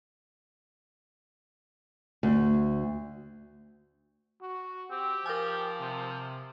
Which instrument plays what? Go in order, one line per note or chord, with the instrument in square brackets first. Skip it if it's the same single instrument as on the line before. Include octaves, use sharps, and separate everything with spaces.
[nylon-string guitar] D2
[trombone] F#4
[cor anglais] C4 [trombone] G4
[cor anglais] F3 [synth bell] A#4 G5 G#5
[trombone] C3